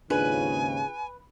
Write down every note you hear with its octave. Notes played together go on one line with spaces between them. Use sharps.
D#2 G#2 C#3 D4 F4 G#4 B4 G#5